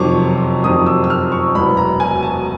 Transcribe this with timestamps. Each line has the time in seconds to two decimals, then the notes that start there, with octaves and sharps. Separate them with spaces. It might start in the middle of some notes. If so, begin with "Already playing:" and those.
Already playing: F2 C3 D#3 F#3 C#6 D6
0.64 F2 C3 D#3 F#3 D#6
0.86 E6
1.04 E6
1.10 F6
1.32 C#6
1.55 E1 E2 B2 F#3 B3 B5
1.77 A#5
2.00 G#5
2.23 A5